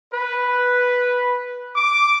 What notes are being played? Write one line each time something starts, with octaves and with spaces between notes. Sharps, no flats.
B4
D6